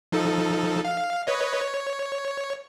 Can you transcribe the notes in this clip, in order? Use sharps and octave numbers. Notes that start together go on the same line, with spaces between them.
F3 D#4 A4
F5
B4 C#5 D#5
C#5